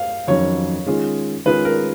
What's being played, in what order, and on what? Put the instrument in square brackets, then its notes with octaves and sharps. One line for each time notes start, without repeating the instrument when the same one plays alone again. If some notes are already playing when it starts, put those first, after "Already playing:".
Already playing: [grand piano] F5
[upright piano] F2 D#3 F#3 C#4 [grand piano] C#5
[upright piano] D#3 G#3 C#4 F4 G#4
[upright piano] D#3 G#3 C#4 F4 G#4 [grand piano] B4
[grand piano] A#4